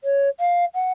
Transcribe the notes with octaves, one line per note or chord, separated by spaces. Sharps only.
C#5
F5
F#5